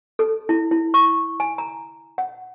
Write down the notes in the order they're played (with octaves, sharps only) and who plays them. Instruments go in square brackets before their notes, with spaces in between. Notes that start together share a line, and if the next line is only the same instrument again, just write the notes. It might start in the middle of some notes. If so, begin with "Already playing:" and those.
[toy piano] A4
E4
E4
C#6
G#5
A#5
F#5